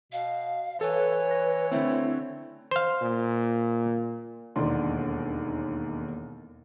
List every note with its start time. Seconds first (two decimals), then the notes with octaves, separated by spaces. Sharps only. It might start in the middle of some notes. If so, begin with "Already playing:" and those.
0.12 B2 F5
0.81 E3 A4 B4 C#5
1.31 A#6
1.71 D3 A3 C4 E4
2.71 C5 F5
3.02 A#2
4.56 E1 D#2 D3 E3 D5 C6